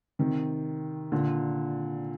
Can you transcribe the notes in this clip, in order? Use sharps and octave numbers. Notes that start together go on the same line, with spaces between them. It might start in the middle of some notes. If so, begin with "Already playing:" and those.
C3 D#3
A#2 D3